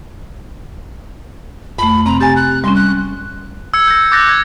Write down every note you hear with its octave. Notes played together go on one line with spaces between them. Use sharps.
F2 A3 B5
C3 C4 A#5
G4 G#5 A6
F#6
G3 C#4 C6
F#6
E6 G#6 C#7
G6 A#6
D6 F#6 G6 A6 A#6 C#7
G#6